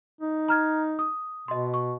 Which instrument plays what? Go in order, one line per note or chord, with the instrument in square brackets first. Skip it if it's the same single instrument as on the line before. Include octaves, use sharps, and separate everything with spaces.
[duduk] D#4
[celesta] A#5 F6 G#6
D#6
[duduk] B2 [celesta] D#5 C6
[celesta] C#6